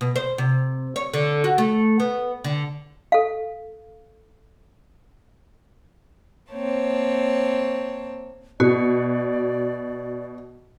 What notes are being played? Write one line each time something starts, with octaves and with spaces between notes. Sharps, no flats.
B2
C5
C3
C#5
D3
F#4
A3
B3
D3
A4 F5
A#3 C4 C#5 A5
B2 F#4 D5